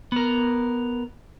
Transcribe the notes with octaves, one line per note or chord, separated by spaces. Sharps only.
B3 A#4